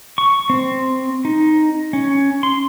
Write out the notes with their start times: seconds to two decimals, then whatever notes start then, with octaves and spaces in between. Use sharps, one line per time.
0.18 C#6
0.50 C4
1.25 D#4
1.93 C#4
2.43 C6